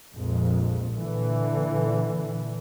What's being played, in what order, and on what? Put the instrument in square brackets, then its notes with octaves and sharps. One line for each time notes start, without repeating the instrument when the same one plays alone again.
[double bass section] A#1 F2 G#3
A#2 D3 E3